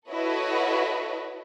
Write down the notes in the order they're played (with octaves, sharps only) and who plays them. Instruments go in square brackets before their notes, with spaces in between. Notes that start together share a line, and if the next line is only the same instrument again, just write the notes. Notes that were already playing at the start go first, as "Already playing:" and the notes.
[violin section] E4 F#4 A4 B4 C#5 D#5